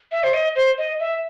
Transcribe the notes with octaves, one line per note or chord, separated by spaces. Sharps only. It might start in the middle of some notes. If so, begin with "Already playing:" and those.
E5
C5
D#5
C5
D#5
E5